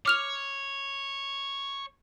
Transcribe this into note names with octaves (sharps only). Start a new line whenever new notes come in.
C#5 D6 F6 F7